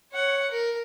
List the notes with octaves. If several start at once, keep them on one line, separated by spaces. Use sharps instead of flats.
C#5 F#5
A#4